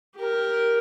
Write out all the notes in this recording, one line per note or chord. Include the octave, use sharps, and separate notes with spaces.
G4 A#4